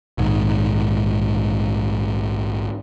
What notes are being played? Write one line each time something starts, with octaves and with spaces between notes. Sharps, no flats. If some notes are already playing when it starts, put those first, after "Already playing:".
A#1 G#2 D#3